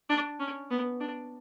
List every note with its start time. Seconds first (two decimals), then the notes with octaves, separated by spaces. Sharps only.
0.10 D4
0.40 C#4
0.70 B3
1.00 D4